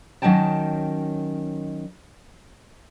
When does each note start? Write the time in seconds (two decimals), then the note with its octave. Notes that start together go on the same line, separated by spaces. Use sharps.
0.22 D#3 F#3 C#4 D#5 G5 A5